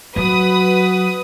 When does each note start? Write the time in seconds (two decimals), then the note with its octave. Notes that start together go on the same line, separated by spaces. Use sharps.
0.16 F#3 F#4 B4 D#6